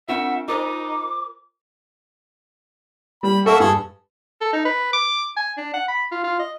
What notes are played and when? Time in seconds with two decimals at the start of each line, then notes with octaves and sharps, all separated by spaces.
0.09 C4 D4 F4 E5 F#5
0.48 D#4 F4 A#4 C5 D6
3.23 G3 B5
3.46 A#3 F#4 A4 E5 C#6
3.60 G2 G#4 A4
4.41 A4
4.53 D#4
4.65 B4
4.93 D6
5.36 G#5
5.57 D4
5.74 F#5
5.88 B5
6.12 F4
6.24 F4
6.39 D#5